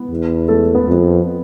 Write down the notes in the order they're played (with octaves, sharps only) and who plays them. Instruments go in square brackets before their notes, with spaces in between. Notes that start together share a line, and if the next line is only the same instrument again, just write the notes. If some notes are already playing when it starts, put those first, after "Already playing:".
Already playing: [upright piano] B3
[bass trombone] E2
[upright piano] A3 A4
B3 B4
[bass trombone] F2